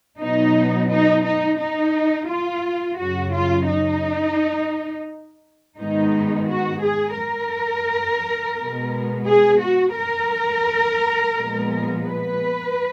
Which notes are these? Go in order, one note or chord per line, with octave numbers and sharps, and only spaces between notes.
B2 F#3 B3 D#4
D#4
D#4
D#4
F4
F#2 C#3 F#3 F#4
F4
D#4
G#2 D#3 G#3 B3 D#4
F#4
G#4
A#4
B2 G#3 B3
G#4
F#4
A#4
A#2 F3 G#3 B3
B4